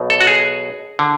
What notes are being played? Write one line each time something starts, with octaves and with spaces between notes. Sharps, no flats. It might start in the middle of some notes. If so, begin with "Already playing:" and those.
Already playing: B1 B2
A4
F#4
G#4
D3